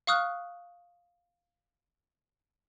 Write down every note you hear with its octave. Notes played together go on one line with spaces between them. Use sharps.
F5 C#6 D#6 F6 F#6